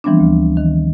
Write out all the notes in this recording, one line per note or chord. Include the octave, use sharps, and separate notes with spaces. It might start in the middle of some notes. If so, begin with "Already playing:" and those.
E3 F3 G3 B3 C4 D4
D2
D#3